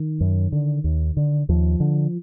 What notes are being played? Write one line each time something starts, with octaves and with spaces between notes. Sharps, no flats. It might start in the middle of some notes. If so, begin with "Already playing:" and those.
Already playing: D#3
F#2
D3
D#2
D3
D#2 F3
D3